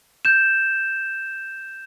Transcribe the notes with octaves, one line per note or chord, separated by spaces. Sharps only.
G6 E7